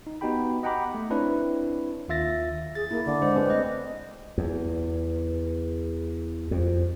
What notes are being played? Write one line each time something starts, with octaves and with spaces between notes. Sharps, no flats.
D#4
B3 D#4 F#4 G4 G5 B5
D#5 F#5 G5 A#5 B5 D6
A3
C4 D4 E4 B4 C#5
D#2 D#3 F4 E5 A6 A#6
G#4 A6
A#3 E4
D3
G#3 D4 C5
C4 G#4 B4
A3 D#5
E2
F2